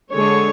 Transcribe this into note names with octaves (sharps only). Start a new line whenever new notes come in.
D3 G#3 D4 C#5